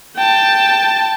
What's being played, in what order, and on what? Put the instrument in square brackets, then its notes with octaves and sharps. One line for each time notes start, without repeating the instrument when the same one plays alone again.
[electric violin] G5 A5